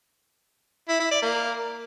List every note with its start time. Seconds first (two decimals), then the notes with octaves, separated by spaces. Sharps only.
0.89 E4
1.00 E4
1.11 D5
1.22 A#3